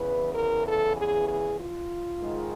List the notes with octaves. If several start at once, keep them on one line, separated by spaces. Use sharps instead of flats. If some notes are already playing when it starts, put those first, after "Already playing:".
Already playing: E2 C#3 E3 B4
A#4
A4
G#4
G#4
F4
G#2 D#3 G#3